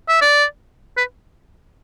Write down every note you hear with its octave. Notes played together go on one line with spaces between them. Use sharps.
E5
D5
B4